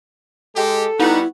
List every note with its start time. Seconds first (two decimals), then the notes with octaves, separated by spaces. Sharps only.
0.56 G#3 G4 A4
0.99 G3 B3 D#4 E4 F#4